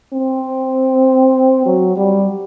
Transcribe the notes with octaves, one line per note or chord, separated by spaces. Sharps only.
C4
F#3
G3